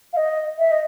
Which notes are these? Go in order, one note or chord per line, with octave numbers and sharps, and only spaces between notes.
F5
D#5
E5
D#5